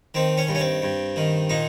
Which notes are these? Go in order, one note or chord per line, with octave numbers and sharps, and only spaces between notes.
D#3 C4
C#4
G2
C#4
C4
G2
D#3
A#2 D#4